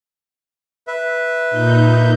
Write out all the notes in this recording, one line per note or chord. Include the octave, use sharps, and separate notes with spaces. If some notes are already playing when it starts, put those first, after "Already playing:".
B4 E5
A#2 D#4 G6